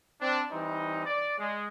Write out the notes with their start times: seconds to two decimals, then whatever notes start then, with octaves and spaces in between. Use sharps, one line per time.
0.20 C4 D4
0.51 E3 G3 C4 D#4
1.05 D5
1.38 G#3